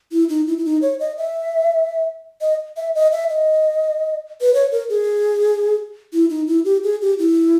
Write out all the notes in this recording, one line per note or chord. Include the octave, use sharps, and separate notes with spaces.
E4
D#4
E4
E4
D#4
C#5
D#5
E5
D#5
E5
D#5
E5
D#5
B4
C#5
A#4
G#4
E4
D#4
E4
G4
G#4
G4
E4